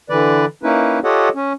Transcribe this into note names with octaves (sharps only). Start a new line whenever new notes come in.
D3 E3 B4 D5
A#3 C#4 D#4 E4 B4
F4 G4 A4 C#5 D#5 F#5
C#4